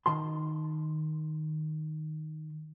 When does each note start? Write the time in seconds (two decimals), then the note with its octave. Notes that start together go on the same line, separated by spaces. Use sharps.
0.06 D#3 A5 C6